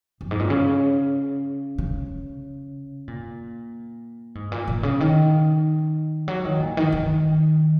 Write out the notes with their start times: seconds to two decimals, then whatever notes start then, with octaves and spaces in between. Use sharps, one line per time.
0.21 F#2
0.31 G#2
0.39 A#2
0.50 C#3
1.78 C#3
3.08 A#2
4.35 G#2
4.52 A#2
4.67 A#2
4.83 C#3
5.00 D#3
6.28 F#3
6.45 D#3
6.60 A#2
6.77 D#3
6.92 D#3